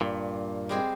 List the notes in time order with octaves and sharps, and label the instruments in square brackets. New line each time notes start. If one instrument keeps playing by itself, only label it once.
[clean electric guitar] G2 A#2
[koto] G3 G#3 C4